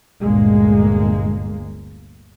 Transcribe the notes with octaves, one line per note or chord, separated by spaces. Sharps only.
G1 D2 A#2 G#3 A#3